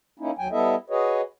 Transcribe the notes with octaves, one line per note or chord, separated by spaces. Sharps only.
A#3 C#4 D#4 E4
D#2 F#3 G5 G#5
G3 B3 E4 A4 D#5 E5
F#4 G#4 B4 C#5 D#5